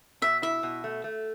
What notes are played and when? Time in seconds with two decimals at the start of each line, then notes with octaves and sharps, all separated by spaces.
0.22 B2 E5
0.42 E4 E5
0.63 B2
0.84 A3
1.04 A3